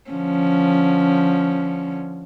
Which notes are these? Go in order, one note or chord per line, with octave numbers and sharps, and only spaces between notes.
D3 F3 C#4